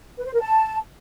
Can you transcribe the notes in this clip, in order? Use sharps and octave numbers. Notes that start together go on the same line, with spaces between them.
B4
C5
A#4
A5